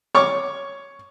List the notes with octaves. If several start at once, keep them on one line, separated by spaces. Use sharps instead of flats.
C#5 C#6 D6